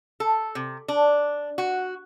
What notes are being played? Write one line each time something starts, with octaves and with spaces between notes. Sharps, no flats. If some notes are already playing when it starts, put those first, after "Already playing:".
A4
C3
D4
F#4